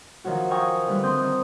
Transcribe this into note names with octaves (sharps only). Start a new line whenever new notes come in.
D#3 F3 F#3 F#4
F5 G5 G#5 A#5 C#6 D#6
D3 E3 G3 F#6
C4 C6 D#6 G6
D#3 D#6